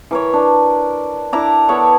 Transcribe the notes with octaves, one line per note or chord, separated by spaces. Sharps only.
E3 A#4 C#5
D4
D4 E4 A#5 D6
B3 A4 C#5 D5